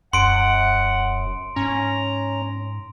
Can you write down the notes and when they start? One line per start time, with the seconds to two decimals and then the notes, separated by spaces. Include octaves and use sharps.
0.13 E1 F#2 F#5 C6 D7
1.56 G#2 C#4 A#5